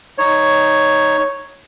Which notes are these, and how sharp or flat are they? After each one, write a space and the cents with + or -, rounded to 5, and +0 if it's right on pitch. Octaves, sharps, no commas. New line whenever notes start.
D#4 +0 C#5 +0